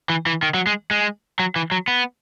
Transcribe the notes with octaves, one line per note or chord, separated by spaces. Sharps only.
E3
E3
D#3
F#3
G#3
G#3
F#3
E3
F#3
B3